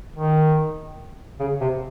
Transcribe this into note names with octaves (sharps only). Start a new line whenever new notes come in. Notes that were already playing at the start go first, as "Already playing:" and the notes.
D#3
C#3
C3